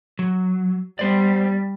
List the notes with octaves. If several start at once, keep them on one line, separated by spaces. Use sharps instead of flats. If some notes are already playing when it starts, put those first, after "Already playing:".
F#3
G3 B3 C5 D5